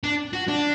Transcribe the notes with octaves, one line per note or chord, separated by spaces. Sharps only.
D4
F#4
D4